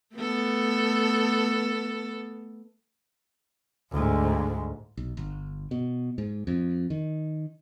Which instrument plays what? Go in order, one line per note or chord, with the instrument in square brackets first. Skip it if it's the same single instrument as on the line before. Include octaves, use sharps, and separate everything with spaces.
[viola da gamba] A3 B3 A4
[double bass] D2 G#2
[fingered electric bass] B1
G1
B2
G#2
F2
D#3